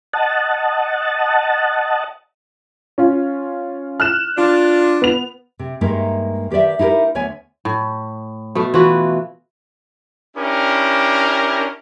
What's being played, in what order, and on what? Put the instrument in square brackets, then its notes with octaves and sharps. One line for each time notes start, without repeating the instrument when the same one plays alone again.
[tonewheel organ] D#5 F#5 A5
[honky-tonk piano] C#4 F4
F6 F#6 E7
[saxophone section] D4 F4
[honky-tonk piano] B3 F7
[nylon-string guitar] C3
G2 G#3 A#3 D#4 E5
D#3 G4 B4 D5 E5
D#4 E4 G4 G#4 A#4
D2 B3 C#5 E5 G#5
[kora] A2
B2 A3
E3 F4 F#4 B4
[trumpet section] C#4 D4 E4 G4 A#4